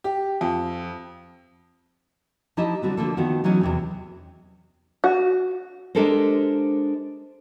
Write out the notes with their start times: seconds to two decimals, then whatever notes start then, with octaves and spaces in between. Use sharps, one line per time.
0.04 G4
0.41 F2
2.57 F3 D#4 E4 G4 D#5 A5
2.82 D3 G3 C4 F#4
2.97 D3 F3 A#3 A4
3.17 D#3 F3 B3 F4 F#4
3.44 E3 F#3 G#3 C#4 D#4
3.61 E2 C3 C4
5.04 F#4
5.95 G#3 D4 G4 A4 A#4 C5